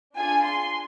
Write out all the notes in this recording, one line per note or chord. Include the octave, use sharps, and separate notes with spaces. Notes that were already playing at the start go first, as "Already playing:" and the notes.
D4 F4 G#4 G#5
C6